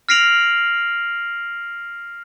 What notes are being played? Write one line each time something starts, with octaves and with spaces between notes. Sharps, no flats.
F6 A#6 C7 D7 F7 F#7